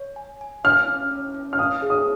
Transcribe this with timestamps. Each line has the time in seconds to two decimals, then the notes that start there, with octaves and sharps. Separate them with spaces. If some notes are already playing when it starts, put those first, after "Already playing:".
Already playing: C#5
0.16 G#5
0.41 G#5
0.64 F5 F6
0.88 C#4
1.11 C#4
1.34 C#4
1.53 F6
1.59 F5 D#6
1.82 G#4
1.90 D#6